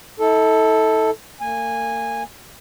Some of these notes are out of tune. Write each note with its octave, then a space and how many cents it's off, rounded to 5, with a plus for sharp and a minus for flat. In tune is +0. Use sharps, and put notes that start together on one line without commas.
E4 -45 A4 +0
A#3 -35 G#5 -15